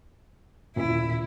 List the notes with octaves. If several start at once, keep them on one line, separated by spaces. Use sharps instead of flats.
D#2 A#2 C#3 E4